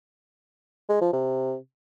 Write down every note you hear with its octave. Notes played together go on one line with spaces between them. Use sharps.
G#3
F3
C3